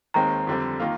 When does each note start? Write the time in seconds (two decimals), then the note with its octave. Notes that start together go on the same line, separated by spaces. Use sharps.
0.14 D#2 D#3 G#3 C4 A#5
0.47 F2 D3 G3 C4
0.80 D#3 A#3 F4